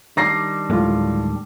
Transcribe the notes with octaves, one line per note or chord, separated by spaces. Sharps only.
D#3 G3 D4 A#5 A#6 C7
D1 A2 G#3 A#3 F4